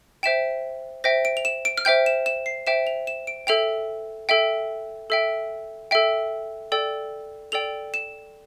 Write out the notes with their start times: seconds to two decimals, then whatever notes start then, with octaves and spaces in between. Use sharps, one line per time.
0.23 C5 E5 G5 E7
1.04 C5 E5 G5 A#6
1.25 D7
1.37 F7
1.45 E7
1.65 D7
1.78 F6
1.85 C5 E5 G5 G6
2.06 E7
2.26 E7
2.46 C7
2.67 C5 E5 G5 E7
2.87 F7
3.07 E7
3.27 D7
3.47 A4 E5 G5 F7
4.29 A4 E5 G5
5.10 A4 E5 G5
5.91 A4 E5 G5
6.72 A4 D5 G5
7.52 A4 D5 G5 F7
7.94 E7